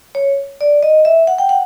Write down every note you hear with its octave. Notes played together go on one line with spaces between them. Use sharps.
C#5
D5
D#5
E5
F#5
G5
F#5